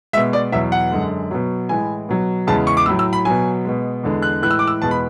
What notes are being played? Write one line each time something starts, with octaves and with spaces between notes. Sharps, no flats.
B2 G#3 E5
D5
E2 B2 F#3 E5
F#5
F#2 D3 G#3
B2 F#3
A2 E3 G#3 G#5
B2 F#3
E2 C#3 G#3 A5
C#6
D6
A2 F#3 E6
E6
B5
B2 F#3 G#5
B2 G#3
E2 D3 G#3
F#6
A2 E3 G#3 F#6
E6
D6
E6
E2 B2 G#3 A5
B5